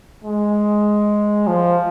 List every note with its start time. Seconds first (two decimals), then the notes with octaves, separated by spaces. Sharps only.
0.24 G#3
1.47 F3